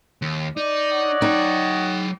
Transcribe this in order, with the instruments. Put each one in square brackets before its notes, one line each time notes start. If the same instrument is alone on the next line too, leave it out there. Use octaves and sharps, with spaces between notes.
[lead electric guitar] D#2
[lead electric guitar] D#4 [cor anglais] D5
[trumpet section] C#5 D#5 F#5
[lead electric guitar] F#3 G5 [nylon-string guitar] D#4